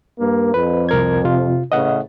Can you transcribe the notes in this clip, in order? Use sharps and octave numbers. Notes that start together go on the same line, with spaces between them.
G2 A#3
F2 B4
C2 A#4 G#6
C3 F4
A2 C#3 E3 D#5 F#5